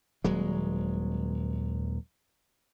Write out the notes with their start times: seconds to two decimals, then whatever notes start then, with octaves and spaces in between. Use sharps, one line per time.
0.24 D#1 F#3 G#3